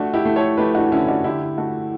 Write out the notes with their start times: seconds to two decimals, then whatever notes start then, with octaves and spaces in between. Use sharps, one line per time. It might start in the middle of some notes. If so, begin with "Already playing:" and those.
Already playing: A3 D4 F#4
0.13 E4 G4
0.25 A3
0.36 A4 C#5
0.57 A3 G4 B4
0.75 D4 F#4
0.92 D3 C#4 E4
1.08 D4 F#4
1.24 D3 E4 G4
1.58 A3 F#4 A4